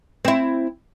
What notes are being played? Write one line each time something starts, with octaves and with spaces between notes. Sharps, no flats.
C4 E4